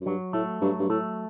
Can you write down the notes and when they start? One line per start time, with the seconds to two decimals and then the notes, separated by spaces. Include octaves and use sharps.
0.01 F#2
0.06 G2 F#3
0.33 A2 A3
0.62 G2 F#3
0.79 G2
0.89 A2 A3